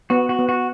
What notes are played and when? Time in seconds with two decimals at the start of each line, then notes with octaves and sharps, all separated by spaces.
0.10 B3 F#4
0.29 F#4
0.39 B3
0.49 F#4